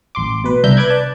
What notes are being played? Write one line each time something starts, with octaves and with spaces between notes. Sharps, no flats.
A1 C6 D6
B2 B4
C2 D4 E5 A#5 G6
B4 B5 D6 F#6 G#6
D5 A5